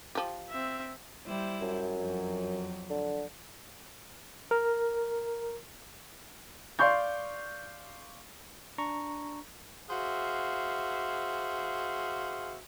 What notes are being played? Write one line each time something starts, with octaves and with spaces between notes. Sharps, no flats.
F3 G4
C4 E5
G3 E4 C5
F#2
F2 F#3
D3
A#4
D5 F5 C6 C#6 G6
D4 A#5 C#6
F#4 G#4 C5 E5 F5